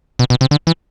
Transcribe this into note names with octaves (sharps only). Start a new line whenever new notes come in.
B2
B2
C3
D3
E3